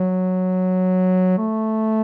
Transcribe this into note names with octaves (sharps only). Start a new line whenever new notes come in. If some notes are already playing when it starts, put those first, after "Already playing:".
Already playing: F#3
A3